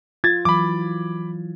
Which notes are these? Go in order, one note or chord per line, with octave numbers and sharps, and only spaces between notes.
F4 G#6 A6
E3 F#3 B5 D6